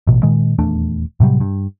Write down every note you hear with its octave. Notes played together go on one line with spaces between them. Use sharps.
A1 B2
A#2 D#3 G#3
D#1 E2 A3 D4
A2 C3 F#3 G3
G2